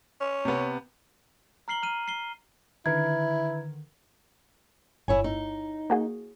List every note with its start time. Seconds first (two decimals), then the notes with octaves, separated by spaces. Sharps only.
0.21 C#4
0.45 C3 B3
1.68 A#5 F6 C7 F#7 G7
1.82 A#5 F6 D#7
2.08 C7 G7
2.86 D3 D#3 E4 B4 A#5 G#6
5.08 G1 E4 C#5 G#5
5.24 D#4
5.90 A#3 F#4 G#4